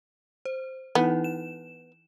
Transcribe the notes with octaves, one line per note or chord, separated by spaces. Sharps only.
C5
E3 B3 D#4 E4
E7